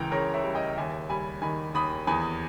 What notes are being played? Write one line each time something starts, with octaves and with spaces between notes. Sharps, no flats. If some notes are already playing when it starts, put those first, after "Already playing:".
Already playing: C#2 E3 G5 A#5
C#3 A#4 C#5
C#5 E5
G3
D#5 G5
D#2 E5 G#5
G3 G#5 B5
D#3 G#5 B5
D#2 B5 D#6
E2 G#5 B5